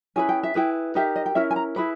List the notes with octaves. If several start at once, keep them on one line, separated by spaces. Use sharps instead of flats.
C#4 E4 G#4 B4 G#5
G5
E5
E4 G#4 B4 G5
D#4 G4 A#4 E5
D#5
G5
C#4 E4 A#4 E5
G#5
A#5
E4 G#4 B4 B5